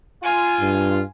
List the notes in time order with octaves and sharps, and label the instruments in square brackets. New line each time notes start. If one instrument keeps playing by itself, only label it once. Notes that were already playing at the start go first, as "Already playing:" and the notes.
[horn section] F4 [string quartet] G#5
[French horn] G2